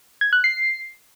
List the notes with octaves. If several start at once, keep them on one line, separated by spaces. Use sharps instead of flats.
G#6
F#6
C7